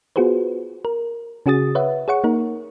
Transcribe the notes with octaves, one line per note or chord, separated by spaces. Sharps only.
B3 F4 F#4 G#4 B4 C5
A#4
C#3 C#4 F#4 G#4 D#6 A6
B4 C#5 E5 F#5
G#4 C#5 F#5 C#6
A#3 D#4 A#4